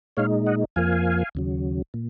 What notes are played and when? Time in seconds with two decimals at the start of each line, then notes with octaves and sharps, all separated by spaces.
0.17 A#2 G#3 D#4 C#5 F5
0.46 D#5 F#5
0.76 F2 F3 A#3 F5 G#5
1.35 D#2 C#3 F#3
1.94 A#2